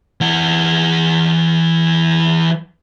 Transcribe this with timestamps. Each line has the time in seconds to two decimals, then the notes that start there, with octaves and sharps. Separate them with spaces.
0.21 E3 F#5